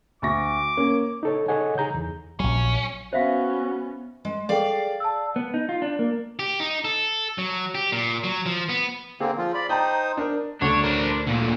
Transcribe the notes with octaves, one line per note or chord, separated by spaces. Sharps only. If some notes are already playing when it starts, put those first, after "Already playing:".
D2 C#6 D6 A#6
A#3 C#4
D#4 A4 C#5
G#4 A4 C#5 D#5 F#5 G#5
D#4 G#4 A#5 G6
E2
A#1 F#3 C#4
B3 C#4 F#4 C5 E5 F5
G#3
G#4 A4 D5 F5 G5
A5 E6
B3
D#4
F4
D4
A#3
G4
D#4
A4
F#3
G4
A#2
F#3
F3
B3
D3 A#3 C4 G#4
F3 F4
D5 B5
D#4 C5 G5 A5 A#5 D#6
D4 A#4
D2 A3 D4 C#5 E7
A#4 C5
A#2 D3